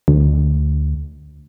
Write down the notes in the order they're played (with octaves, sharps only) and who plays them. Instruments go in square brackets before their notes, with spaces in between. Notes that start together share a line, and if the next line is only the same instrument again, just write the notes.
[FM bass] D2